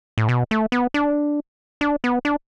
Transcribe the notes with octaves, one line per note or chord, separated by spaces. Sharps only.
A2
B2
A3
B3
D4
D4
B3
D4